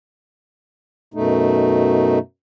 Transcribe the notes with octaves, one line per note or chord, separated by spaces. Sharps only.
F#2 B2 A3 D#4